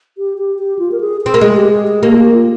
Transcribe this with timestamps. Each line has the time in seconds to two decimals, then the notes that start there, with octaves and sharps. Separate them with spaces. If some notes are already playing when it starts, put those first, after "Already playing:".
0.18 G4
0.38 G4
0.59 G4
0.79 F4
0.92 A#4
1.00 G#4
1.21 C4 G#4
1.34 A#3
1.41 G#3 G#4
1.57 G4
1.72 G#4
1.87 G#4
2.03 A#3 G4
2.14 F4
2.18 G4
2.34 F4